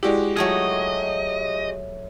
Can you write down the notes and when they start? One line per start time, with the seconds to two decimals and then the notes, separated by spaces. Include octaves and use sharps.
0.03 G#3 E4 F#4 G4 D5
0.37 F#3 A3 F4 G#4 D#5